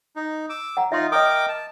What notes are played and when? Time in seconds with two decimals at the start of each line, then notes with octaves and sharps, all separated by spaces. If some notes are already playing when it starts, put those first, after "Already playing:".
0.16 D#4
0.50 D6 E6
0.77 F#5 A#5
0.92 D#4 F4 E5 C6
1.12 A#4 D#5 G5 D6 D#6
1.48 A5